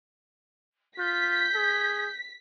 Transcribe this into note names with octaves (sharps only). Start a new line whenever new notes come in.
F4 G6 B6
G#4